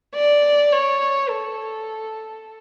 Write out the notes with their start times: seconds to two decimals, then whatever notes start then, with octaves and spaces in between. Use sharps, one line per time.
0.15 D5
0.72 C#5
1.29 A4